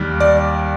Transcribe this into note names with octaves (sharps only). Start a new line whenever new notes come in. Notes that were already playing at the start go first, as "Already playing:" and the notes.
Already playing: D#2 D#3 G3
D5